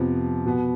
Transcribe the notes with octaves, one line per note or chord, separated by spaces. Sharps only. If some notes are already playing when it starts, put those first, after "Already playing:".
Already playing: F2 C3 F3 B3
B2 B3